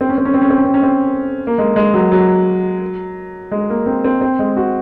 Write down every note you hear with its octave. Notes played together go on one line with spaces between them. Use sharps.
C4
C#4
C4
C#4
C4
C#4
C4
C#4
C4
C#4
C4
A#3
G#3
G#3
F#3
F#3
G#3
A#3
C4
C4
C4
G#3
F#4